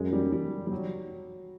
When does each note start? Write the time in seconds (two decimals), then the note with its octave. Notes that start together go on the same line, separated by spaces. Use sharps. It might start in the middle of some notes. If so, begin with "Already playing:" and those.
Already playing: F#2 G#3
0.13 G3
0.32 G3
0.67 G3
0.71 F#3